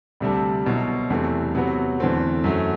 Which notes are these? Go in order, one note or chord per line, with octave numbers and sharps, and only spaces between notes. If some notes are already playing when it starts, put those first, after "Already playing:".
D2 C3 G3 D4 A4
C2 B2 F#3
E2 C3 E3 A3
C3 F#3 B3
E2 D3 A3 C4
F#2 F#3 A3